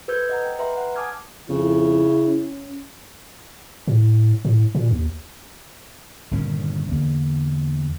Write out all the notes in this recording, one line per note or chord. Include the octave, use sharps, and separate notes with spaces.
A4 B4 C5 E6 G6 G#6
D#5 F#5 A#5
G5
B4 E5 A#5 C6
F#5
G#5 A5 D6 D#6 F6 G#6
F2 C#3 E4
C#4
A2
A2
A#2
D#2
G1 A#2 D#3 C#4
E2 D3 A#3